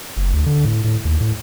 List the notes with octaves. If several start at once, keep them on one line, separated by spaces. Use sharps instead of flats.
F#1
D2
D3
A2
A2
D#2
A2